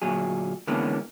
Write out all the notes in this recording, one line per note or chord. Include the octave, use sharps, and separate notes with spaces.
D2 A#2 F#3 G#4
D3 E3 G#3 A#3 B3 C#4